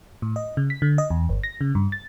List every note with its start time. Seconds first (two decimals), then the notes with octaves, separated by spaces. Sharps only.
0.22 A2
0.36 D#5
0.57 C#3
0.70 B6
0.82 D3
0.98 D#5
1.10 E2
1.29 G1
1.44 A#6
1.61 C#3
1.75 G2
1.92 A6